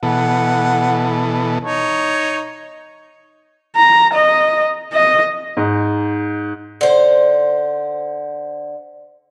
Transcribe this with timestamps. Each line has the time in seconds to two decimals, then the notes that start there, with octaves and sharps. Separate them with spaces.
0.03 B2 E3 A4 F#5
1.64 D#4 C#5
3.76 A#5
4.13 D#5
4.93 D#5
5.57 G#2
6.81 D3 C5